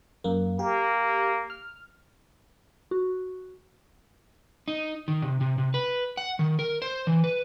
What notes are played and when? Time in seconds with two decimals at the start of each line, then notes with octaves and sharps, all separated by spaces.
0.24 F#2 A#3
0.59 A#3 G4
1.50 F6
2.91 F#4
4.68 D#4
5.08 D#3
5.22 C3
5.41 C3
5.58 C3
5.74 B4
6.17 F#5
6.39 D#3
6.59 A#4
6.82 C5
7.07 E3
7.24 B4